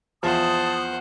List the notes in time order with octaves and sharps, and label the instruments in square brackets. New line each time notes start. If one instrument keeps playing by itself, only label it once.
[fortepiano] E2 F3 [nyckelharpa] C5 F#5 [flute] A5 [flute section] D#6